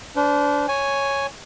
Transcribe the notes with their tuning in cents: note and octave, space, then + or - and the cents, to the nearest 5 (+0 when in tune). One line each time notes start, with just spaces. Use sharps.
D4 -25 C5 -40
C#5 +0 G#5 +0